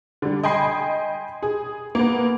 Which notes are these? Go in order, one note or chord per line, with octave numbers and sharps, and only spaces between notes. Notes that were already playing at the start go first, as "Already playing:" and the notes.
D3 G3
D#5 G5 G#5 B5 C6 C7
G#4
A#3 B3